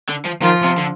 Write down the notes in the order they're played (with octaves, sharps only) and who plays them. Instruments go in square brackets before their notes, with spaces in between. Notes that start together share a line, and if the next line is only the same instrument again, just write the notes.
[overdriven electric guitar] D3
F3
[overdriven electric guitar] D#3 [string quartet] F3 F4
[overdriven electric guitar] C3
D3